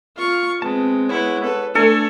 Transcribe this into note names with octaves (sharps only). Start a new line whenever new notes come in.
F4 F5 C#6
G#3 B3 C4 A5
B3 E4 C#5 F#5
A4 B4
A3 D4 A4 G#5